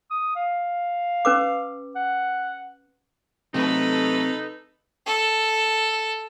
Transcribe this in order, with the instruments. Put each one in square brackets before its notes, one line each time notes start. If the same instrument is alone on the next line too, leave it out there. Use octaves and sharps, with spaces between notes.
[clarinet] D#6
F5
[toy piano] C#4 B4 D6
[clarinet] F#5
[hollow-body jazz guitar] C3 [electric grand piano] F#3 A3 [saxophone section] D#4 [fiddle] A4 B4
[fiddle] A4